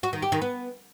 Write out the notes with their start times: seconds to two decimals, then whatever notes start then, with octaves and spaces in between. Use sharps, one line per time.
0.03 F#4
0.13 D#3
0.22 G4
0.32 D#3
0.42 B3